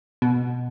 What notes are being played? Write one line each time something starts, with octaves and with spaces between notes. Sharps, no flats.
B2